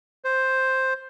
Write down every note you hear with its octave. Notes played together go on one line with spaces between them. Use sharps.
C5